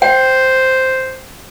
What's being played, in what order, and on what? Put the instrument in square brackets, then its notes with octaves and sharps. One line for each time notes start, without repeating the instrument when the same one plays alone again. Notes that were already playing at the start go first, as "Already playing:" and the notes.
[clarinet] C5 [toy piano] G5